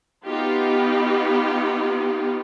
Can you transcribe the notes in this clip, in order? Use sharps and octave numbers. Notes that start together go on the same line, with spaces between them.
B3 D#4 F4 G4